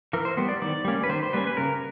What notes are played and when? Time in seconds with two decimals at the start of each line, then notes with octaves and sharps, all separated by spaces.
0.13 E3 A#4
0.25 C5
0.37 G3 B3 C5
0.49 D5
0.62 D#3 D5
0.85 G3 A#3 C#4
1.03 B4
1.09 D#3 C5
1.23 C5
1.33 G3 A#3 C#4 B4
1.47 B4
1.57 C#3 A#4